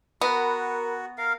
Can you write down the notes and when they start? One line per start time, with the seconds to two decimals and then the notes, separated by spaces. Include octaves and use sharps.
0.21 B3 F#4 A#4 A#5 B5
1.18 A#4 F5